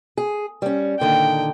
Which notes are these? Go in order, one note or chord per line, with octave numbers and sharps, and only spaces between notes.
G#4
G3 C#4
A#2 D3 D#3 G5